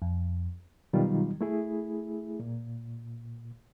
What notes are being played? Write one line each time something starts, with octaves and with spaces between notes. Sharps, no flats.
F2
B2 D#3 F#3 G3 D#4 F4
A3 E4 G#4
A#2